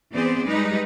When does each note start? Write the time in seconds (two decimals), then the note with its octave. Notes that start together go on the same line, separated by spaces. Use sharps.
0.11 E3 B3 C4 G#4 C5 D5
0.47 G3 G#3 D#4 B4